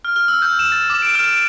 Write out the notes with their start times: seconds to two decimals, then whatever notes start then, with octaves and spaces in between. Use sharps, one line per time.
0.05 F6
0.16 F6
0.28 E6
0.42 G6
0.59 E7
0.72 A6
0.90 D6
1.02 D7
1.15 F6
1.31 D7